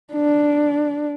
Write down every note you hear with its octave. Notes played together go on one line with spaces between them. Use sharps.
D4